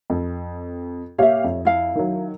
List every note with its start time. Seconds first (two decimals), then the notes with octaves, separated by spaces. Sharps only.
0.10 F2
1.18 A#2 G4 C#5 E5 F5
1.44 F2
1.65 E4 F5 A5
1.95 D#3 F#3